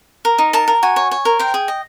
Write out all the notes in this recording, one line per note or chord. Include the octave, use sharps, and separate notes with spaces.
A#4
D#4
A#4 A5
A#4
F#4 G#5
C#5
C#5
A#4
C5 G5
G#4
D#5